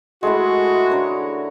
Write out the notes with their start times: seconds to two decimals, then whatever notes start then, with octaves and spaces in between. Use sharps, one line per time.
0.23 G#3 A3 E4 F#4
0.90 D3 A#4 C#5